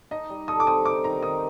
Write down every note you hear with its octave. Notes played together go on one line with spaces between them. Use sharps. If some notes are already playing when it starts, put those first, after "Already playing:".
D#4 D#5
G3
A4 D#6
D6
C4 D#6
D#4 D6
D#3 A#5
D#3 D#6